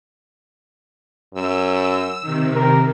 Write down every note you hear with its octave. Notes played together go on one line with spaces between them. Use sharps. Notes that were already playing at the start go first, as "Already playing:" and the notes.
F#2 E6
C3 D#3
G4 A#4